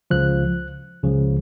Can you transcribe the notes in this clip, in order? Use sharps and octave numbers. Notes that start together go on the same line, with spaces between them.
C#2 C#3 F3 F#6
C#2 C#3 F3